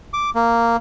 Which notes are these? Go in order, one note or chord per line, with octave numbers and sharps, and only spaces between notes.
D6
A#3